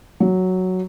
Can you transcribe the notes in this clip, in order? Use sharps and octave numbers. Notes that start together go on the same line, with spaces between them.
F#3